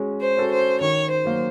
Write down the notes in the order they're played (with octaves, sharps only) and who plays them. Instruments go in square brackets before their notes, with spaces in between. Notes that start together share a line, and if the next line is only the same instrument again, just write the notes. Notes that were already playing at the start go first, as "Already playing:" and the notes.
Already playing: [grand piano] G#3 C#4 F#4
[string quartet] C5
[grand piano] C#4 F#4 A4
[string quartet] C5
[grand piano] D#3 [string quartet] C#5
[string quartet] C5
[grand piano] F#3 A#3